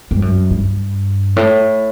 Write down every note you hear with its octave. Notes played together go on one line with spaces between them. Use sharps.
G2
F#2
G2
A2